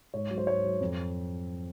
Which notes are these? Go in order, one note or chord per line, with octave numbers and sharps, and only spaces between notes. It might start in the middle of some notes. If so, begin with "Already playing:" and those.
G#2 C#5
F#3
C5
G#2 C#5
F#3
F2